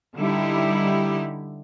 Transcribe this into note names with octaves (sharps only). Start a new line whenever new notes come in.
D3 G3 D#4 E4 G4